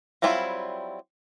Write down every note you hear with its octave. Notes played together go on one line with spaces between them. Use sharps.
F#3 G3 C4 E4 F4